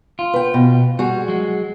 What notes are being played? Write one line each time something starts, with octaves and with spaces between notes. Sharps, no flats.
F4
B4 G5
B2
G3 F#4 G#4
F#3 G#3